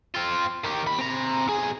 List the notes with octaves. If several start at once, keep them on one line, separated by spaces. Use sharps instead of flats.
C4 F4
D#3 G4
D#2 B5
C4 A#5
B1 G#4